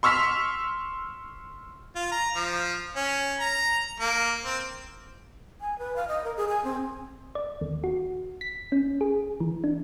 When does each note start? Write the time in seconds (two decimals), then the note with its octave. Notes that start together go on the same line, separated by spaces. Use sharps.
0.03 C6 C#6 E6 F6 B6
1.96 F4
2.11 A#5
2.35 F3
2.96 C#4
3.40 A#5
4.00 A#3
4.45 C4
5.61 G#5
5.79 B4
5.96 F5
6.08 D#5
6.24 A#4
6.37 G#4
6.49 G#5
6.64 C4
7.35 D5
7.61 D#2
7.84 F#4
8.41 B6
8.72 C#4
9.01 G#4
9.40 E3
9.64 D4